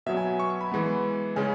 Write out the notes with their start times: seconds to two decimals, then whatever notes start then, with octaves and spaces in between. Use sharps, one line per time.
0.06 B2 F#3 B3 E5
0.17 G#5
0.40 C#6
0.50 C#6
0.61 B5
0.72 E3 G#3 B3
1.36 C#3 G#3 C#4 G#5